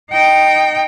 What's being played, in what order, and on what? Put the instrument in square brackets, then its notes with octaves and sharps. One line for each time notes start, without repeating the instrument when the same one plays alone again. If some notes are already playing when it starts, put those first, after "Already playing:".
[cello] D#4 G5